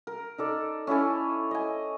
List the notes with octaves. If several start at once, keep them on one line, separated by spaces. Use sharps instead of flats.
A#4
D#4 A4 D5
C#4 E4 A4 G#5
D#5 G#5